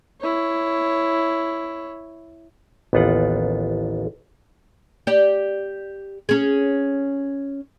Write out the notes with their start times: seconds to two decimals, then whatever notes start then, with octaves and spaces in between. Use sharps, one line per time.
0.21 E4 C#5
2.93 A1 D#2 B3 F4 F#5
5.07 G4 D5
6.29 C#4 G#4